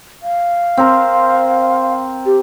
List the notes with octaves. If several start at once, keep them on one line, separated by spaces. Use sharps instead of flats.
F5
C4 A#4 C5
G4